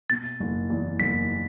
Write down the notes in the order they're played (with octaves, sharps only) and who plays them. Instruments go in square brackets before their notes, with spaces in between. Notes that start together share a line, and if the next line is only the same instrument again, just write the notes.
[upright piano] B2 [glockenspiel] A6
[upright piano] F#1
E2
[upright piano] F#1 [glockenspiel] B6